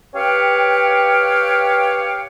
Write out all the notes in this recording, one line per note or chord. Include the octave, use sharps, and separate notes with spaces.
G4 B4 C#5 F5 G5